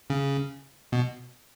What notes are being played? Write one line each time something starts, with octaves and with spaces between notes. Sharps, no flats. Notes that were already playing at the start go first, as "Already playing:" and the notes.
C#3
B2